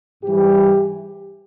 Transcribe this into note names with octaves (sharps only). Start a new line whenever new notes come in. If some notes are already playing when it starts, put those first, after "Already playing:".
G#2 E3 G3 G4